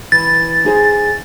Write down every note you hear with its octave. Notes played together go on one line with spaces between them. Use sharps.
E3 A6
D#4 G#4 C5